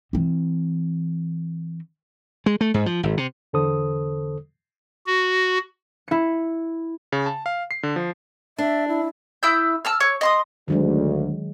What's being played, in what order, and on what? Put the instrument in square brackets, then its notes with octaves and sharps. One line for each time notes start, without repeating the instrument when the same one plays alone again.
[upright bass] E3 C4
[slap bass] G#3
A3
G#2
F3
G#1
C3
[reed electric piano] E2 D3 A4 C5 D#6
[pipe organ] F#4
[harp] E4 C#7
[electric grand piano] C#3
A5
F5
C7
D3
F3
[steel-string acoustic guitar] D4 [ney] E5
[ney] E4
[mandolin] E4 D#6 E6 G6
A5 E6 F6
C#5
D#5 C6 D#6
[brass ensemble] D2 [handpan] D#3 F#3 G#3